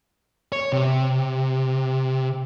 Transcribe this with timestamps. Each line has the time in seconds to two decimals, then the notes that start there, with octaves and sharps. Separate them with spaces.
0.52 C#5
0.72 C3